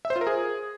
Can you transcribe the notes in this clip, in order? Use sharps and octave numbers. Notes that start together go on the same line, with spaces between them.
E5
C5
F4
A#4
G#4